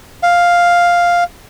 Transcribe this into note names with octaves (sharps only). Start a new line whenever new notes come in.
F5